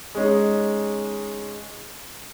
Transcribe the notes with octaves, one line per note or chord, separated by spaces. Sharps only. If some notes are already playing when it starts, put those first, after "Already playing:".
G#3 C#4 D#4